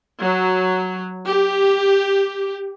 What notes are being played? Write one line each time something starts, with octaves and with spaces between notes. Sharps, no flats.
F#3
G4